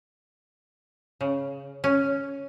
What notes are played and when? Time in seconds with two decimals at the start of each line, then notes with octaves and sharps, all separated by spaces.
1.21 C#3
1.84 C#4